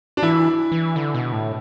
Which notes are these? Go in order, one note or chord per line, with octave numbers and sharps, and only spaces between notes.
D4
E3 E4
E3
D3
B2
A2